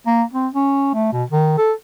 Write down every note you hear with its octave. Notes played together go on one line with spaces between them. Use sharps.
A#3
C4
C#4
A3
B2
D#3
A4